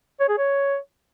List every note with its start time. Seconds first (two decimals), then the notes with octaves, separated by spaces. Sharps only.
0.20 C#5
0.29 G#4
0.38 C#5